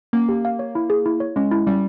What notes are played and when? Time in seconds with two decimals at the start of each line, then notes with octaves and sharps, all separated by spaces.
0.13 A#3 C#4
0.29 G4
0.45 F5
0.59 C#5
0.75 E4
0.90 G#4
1.06 E4
1.20 C#5
1.36 G#3 C#4
1.51 E4
1.67 G3 C#4